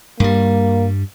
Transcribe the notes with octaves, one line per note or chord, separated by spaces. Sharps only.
G2 G3 A#3